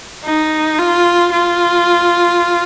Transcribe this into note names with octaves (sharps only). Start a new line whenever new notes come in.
D#4
F4
F4